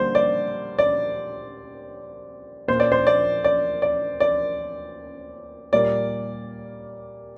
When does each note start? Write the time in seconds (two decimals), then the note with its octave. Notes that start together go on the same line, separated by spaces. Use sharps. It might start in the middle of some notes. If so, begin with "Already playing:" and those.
Already playing: D3 G3 A#3 C5
0.15 D5
0.79 D5
2.68 A#2 A#3 C5
2.80 D5
2.92 C5
3.07 D5
3.44 D5
3.82 D5
4.20 D5
5.73 A#2 G3 A#3 D5